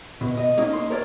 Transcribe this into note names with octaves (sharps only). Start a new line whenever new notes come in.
B2
D#5
A#3 C#4 D#4 D#5
C6
A#4 C#5 D5